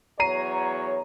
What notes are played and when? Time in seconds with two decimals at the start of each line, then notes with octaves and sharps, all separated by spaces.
0.20 E2 F#3 C#5 A#5 C7 D#7